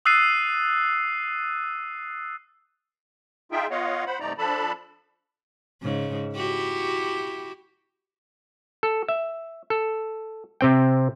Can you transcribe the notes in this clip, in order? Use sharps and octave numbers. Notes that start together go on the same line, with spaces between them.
D#6 E6 F#6 A6 C7 D#7
D#4 F4 G#4 E5 G5
B3 F4 C#5 D#5 F5 F#5
C5 F#5 B5
G2 C3 A3 D#4 D5 A#5
F3 D4 A4 A5 B5
G#2 C#3
E4 F#4 G4
A4
E5
A4
C3 C4 G5